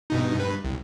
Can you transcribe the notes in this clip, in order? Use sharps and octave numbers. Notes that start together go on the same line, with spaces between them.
G2 B2 D#4
G2 B4
C2